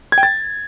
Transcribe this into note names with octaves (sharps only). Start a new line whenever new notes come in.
G#6
G5
A6